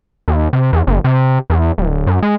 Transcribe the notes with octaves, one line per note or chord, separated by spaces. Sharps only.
D#2
C3
E2
F#1
C3
E2
D1
F#2
G#3